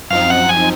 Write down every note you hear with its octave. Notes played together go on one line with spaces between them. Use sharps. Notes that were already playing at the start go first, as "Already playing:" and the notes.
F#2 F3 C4 D#4 F5
F#5
G#5